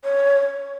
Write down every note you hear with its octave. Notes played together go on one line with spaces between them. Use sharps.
C#5